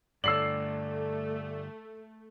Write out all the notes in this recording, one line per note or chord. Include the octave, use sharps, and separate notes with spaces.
G2 D3 A3 D5 E6 C7 F#7